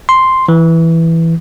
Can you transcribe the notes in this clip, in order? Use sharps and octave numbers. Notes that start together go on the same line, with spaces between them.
C6
E3